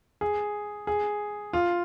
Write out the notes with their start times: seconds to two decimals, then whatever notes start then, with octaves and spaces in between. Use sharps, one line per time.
0.21 G#4
0.87 G#4
1.53 F4